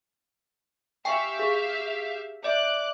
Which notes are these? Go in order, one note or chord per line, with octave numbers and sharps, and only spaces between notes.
G4 E5 F5 G5 G#5 C#6
G#4
D5 E5 D6 F#6